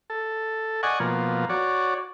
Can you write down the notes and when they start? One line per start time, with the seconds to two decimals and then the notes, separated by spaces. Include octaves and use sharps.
0.10 A4
0.83 D5 D#5 F#5 G#5 C#6
1.00 B2 F3 A#3
1.49 F#4 C#5 D5